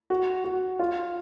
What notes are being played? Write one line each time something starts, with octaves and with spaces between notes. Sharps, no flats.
F#4
F#4
F4